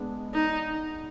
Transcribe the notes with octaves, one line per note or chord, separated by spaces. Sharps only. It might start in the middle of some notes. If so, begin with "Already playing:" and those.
Already playing: G#3 B3 D4
D#4